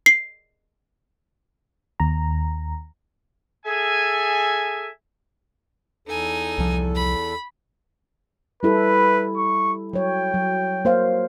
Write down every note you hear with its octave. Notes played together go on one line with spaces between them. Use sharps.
C7
D#2 A#5
G#4 A4 E5 G#5
E2 D#4 A4 G#5
C2 F3
B5
G3 E4 A4 B4
C#6
F#3 C#5 G5
F#3
A#3 C5 F5